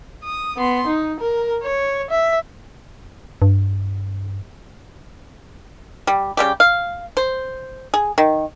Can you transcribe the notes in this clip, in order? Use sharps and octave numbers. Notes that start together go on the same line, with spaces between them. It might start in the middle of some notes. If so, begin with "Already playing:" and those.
D#6
B3 C6
D#4
A#4
C#5
E5
G2
G3
C#3 G3 G4
F5
C5
G#4
D#3